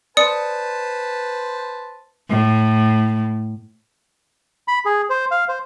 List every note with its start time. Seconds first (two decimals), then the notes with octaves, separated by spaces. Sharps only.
0.17 B4 C5 D5 A5 D#6 C#7
2.29 A2
4.68 B5
4.85 G#4
5.10 C5
5.31 F5
5.49 C5